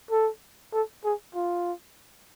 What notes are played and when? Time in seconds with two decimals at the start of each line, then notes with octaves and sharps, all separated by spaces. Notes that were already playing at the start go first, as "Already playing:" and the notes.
0.11 A4
0.73 A4
1.05 G#4
1.35 F4